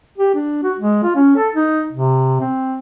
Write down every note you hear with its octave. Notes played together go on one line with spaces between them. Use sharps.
G4
D4
F#4
G#3
F4
C#4
A4
D#4
C3
C4